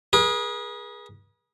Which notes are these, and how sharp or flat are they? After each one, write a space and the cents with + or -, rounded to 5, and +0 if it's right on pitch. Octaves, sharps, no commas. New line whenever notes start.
G#4 +0 B4 -45